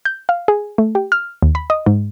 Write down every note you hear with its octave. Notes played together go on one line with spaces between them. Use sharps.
G6
F5
G#4
A3
G4
F6
D#2
B5
D#5
G#2